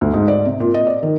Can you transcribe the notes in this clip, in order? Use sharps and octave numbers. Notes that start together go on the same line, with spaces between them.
D2
G#2
D5
C3
A#2
D#5
D5
D#3